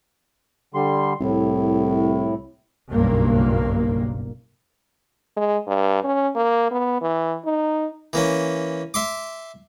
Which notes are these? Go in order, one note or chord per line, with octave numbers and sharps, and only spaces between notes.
D3 G3 C6
C2 A2
F#1 B1 G2 A#3
G#3
G2
C#4
A#3
B3
E3
D#4
E3 A#3 C#4
E5 C6 D6